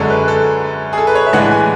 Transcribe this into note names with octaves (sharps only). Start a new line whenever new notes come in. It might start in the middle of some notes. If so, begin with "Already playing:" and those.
Already playing: F#2 D3 G#3 C#4 A4
B4
A4
G#4
A4
B4
C#5
E5
A2 E3 G#3 D4 F#5
G#5